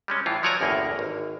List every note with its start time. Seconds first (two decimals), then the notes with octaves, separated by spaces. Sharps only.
0.08 G3 G#3 C#4
0.26 A2 E3 F4
0.43 F3 F#3 C#5 D5 G#5 A#5
0.61 G1 E2 A2 A#3
0.99 G#1